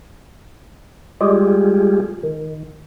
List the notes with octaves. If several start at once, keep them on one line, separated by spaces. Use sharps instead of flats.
G3 G#3 F4 G4 G#4
D#3